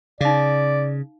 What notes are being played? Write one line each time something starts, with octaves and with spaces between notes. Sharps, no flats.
C#3 D#4 D5 F5